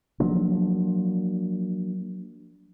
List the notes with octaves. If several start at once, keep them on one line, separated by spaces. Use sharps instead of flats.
F3 F#3 A#3 D4